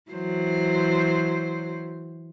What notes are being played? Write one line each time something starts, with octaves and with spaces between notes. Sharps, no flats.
E3 F#3 C5